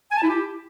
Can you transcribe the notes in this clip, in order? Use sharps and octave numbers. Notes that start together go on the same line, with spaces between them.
G#5
A5
E4
G4